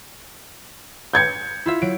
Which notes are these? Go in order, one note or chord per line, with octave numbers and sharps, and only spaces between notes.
G6 G#6 C#7
E4 F4 E5
F#3 D7